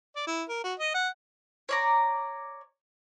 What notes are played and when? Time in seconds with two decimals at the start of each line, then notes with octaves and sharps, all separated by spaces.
0.16 D5
0.27 E4
0.49 A#4
0.64 F#4
0.79 D#5
0.94 F#5
1.69 C#5 D5 A#5